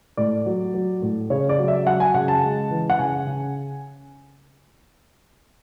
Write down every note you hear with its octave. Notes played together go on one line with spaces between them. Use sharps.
A2 D5
F#3
F#3
A2
C#3 C#5
D5
F#3
E5
F#3 F#5
G#5
C#3 F#5
A5
G#3
E3
F#5
C#3 G#5
C#3